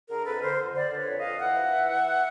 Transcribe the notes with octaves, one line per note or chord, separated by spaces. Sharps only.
D3 G#4 A#4
F2 A4 B4
D3 A#4 C5
F2
D3 C5 D5
D3
B4 C#5
F2
F2 D#5 F5
E3 E5 F#5
G2
E3
E3